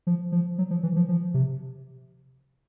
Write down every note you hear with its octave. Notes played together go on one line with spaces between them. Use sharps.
F3
F3
F#3
F3
E3
F3
F3
C3